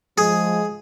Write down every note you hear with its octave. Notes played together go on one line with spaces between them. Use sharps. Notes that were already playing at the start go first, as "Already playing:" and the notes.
F3 G#3 G#4